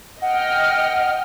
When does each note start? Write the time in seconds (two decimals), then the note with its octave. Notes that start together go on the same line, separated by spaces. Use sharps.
0.22 D#5 F#5 G5 F6